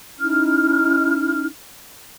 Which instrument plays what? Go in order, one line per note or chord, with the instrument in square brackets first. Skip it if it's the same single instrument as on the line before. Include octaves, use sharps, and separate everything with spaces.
[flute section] C#4 D#4 E4 F6